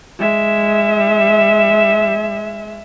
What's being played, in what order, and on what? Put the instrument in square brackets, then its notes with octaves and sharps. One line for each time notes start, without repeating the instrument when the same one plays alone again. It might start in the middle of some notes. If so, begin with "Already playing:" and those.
[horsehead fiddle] G#3 E5